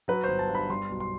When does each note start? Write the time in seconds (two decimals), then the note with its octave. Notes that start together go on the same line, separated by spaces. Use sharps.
0.08 F#3 B4
0.24 G1 C5
0.39 A5
0.49 G2
0.55 B5
0.70 G3 C6
0.90 B1
1.00 C6